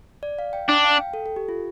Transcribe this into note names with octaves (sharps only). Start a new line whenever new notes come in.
D5
F5
G5
D4 G5
F5
G5
A4
A4
G4
F4